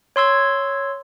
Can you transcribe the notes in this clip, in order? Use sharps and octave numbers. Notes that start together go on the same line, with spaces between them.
C#5 C6 E6 G#6